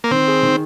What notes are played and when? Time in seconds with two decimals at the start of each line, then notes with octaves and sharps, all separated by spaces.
0.04 A#3
0.11 D#3 C4
0.27 G#4
0.43 D#3